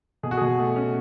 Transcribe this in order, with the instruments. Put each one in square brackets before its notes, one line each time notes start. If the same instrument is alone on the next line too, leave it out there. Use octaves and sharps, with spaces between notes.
[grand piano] B2 G#4
F#4
B2 G#4
A3
C#4